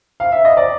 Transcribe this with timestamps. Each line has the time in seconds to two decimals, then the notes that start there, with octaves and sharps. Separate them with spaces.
0.20 F5
0.32 E5
0.45 D#5
0.57 D5